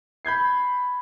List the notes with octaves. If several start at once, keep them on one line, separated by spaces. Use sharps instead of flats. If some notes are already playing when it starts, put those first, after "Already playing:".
B5 G6 G#6 C7